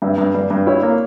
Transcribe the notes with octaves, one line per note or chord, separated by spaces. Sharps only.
G2 E5
G2
G2 D5
G2
E4 C#5
A#3